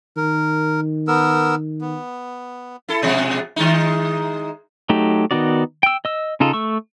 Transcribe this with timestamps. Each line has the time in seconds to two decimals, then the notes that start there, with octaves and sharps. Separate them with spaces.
0.17 D#3 A#4
1.08 B3 A#4 E6
1.81 B3
2.89 E4 A4
3.02 B2 F3 G#3
3.56 D#3 G#3 D#4
4.89 F#3 A3 D#4 G4
5.31 D#3 B3 D#4 F#4 D5
5.83 G5 E6
6.05 D#5 E6
6.40 C#3 D#4 F4 A4
6.53 A3 C#6 E6